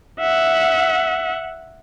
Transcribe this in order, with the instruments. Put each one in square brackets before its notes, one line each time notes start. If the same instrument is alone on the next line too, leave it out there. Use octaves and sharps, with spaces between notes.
[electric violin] E5 F#5